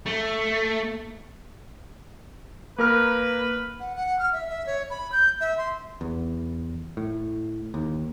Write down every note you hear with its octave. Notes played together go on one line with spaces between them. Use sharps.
A3
A#3 A#4 B4 F6
F#5
F#5
F6
E5
E5
C#5
B5
G6
E5
C6
E2
A2
D#2